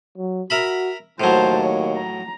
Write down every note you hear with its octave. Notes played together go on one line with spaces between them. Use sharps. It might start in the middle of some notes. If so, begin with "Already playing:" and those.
F#3
F#4 A#4 E5 B5
D#2 A2 F#3 C5 A5
C#5
A#5